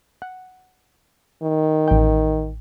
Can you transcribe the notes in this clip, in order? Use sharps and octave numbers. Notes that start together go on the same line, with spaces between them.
F#5
D#3
A1 G5